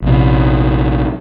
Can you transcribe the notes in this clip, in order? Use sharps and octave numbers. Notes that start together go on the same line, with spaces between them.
A#1 C3